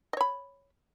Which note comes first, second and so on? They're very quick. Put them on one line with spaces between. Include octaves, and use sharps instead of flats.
D#5 C#5 B5